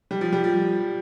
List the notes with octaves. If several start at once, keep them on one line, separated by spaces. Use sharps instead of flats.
G3
F3
G3
F3